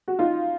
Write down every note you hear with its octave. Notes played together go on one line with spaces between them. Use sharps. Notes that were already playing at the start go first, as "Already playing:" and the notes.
F#4
D#4 F4